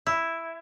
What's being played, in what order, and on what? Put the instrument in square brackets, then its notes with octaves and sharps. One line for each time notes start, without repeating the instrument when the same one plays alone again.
[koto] E4